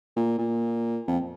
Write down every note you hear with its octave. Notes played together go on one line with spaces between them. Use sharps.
A#2
A#2
F2